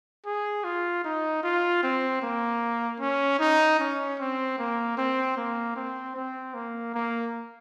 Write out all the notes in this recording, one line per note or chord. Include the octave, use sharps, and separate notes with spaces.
G#4
F4
D#4
F4
C4
A#3
C#4
D#4
C#4
C4
A#3
C4
A#3
C4
C4
A#3
A#3